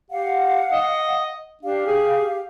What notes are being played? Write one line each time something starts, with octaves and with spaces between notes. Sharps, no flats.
G4 F5 F#5
D#5
D4 G4 F5
G#4